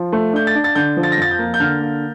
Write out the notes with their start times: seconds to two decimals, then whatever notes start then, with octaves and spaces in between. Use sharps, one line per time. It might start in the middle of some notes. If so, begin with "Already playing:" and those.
Already playing: F3
0.13 A3
0.33 D4 G6
0.47 A6
0.55 D4
0.64 A6
0.75 D3 G6
0.97 F3
1.03 A6
1.12 A#6
1.18 F2 A6
1.31 G6
1.39 A#3
1.54 G6
1.60 D3 F6
1.81 A#3